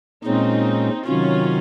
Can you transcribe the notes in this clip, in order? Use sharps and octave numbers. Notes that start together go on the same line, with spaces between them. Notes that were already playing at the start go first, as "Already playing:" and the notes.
A#2 G#3 C4 C#4 D#4
C3 D#3 F#3 C#4 F4